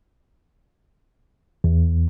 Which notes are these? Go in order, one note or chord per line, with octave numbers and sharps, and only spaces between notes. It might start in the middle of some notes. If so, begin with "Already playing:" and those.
E2